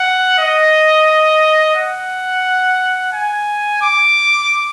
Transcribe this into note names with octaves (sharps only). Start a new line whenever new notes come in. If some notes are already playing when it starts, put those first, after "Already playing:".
Already playing: F#5
D#5
F#5
G#5
D6